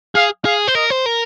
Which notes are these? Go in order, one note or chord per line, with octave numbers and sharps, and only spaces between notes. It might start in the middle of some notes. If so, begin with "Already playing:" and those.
G#4 F5
G#4 F5
C5
A#4 D#5
C5
A#4